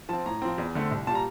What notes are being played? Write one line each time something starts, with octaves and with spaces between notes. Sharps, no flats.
F3 C4 A5
A2 A#5
F3 C4
E2
D3 A3 C4
C2
A#2 G3 A5 A#5